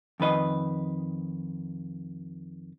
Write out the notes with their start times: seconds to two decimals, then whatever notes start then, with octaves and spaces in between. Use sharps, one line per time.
0.20 F2 D#3 B4 D#5